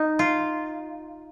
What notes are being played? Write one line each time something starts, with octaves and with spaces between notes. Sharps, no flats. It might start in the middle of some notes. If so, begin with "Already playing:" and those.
Already playing: D#4
F4